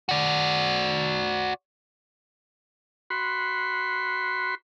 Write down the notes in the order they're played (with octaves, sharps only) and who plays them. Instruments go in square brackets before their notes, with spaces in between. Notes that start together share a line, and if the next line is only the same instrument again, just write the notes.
[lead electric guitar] F#4 D5
[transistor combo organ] F#4 B5 C6